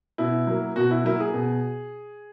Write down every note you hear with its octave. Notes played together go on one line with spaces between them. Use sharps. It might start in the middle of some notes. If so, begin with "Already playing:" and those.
B2 E4
F#3 A#3
B2 F#4
E4
F#3 A#3 E4
G#4
B2